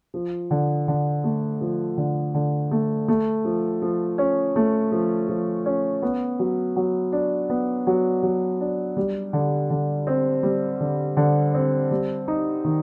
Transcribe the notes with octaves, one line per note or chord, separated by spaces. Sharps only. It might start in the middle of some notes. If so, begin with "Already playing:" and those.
F3
D3
D3
A3
F3
D3
D3
A3
A3
F3
F3
C#4
A3
F3
F3
C#4
B3
F#3
F#3
D4
B3
F#3
F#3
D4
G3
D3
D3
C4
G3
D3
D3
C4
G3
D#4
D#3